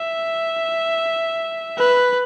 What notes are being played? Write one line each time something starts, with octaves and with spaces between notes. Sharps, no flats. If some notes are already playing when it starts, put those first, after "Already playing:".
Already playing: E5
B4